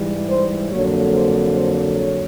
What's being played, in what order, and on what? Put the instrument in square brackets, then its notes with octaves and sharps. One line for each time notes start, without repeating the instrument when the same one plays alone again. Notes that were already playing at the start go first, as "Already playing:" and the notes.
Already playing: [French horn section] G#2 E3 G3
C5
F2 D3 F#3 A#3 C#5
C5
C5
C#5